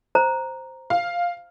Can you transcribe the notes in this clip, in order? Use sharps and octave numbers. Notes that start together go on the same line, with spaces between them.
C5 A#5
F5